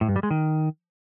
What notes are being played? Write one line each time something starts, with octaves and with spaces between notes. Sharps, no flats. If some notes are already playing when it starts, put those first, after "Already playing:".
A2
G2
G3
G#3
D#3